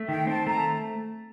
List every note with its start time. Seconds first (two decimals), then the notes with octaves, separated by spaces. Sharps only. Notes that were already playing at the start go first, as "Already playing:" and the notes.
Already playing: A3
0.09 D#3 G5
0.27 C4 A5
0.47 A3 A#5